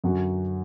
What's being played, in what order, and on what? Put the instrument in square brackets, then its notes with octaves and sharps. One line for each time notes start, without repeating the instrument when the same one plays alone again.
[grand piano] F#2 D3 F#3 C#4 F#4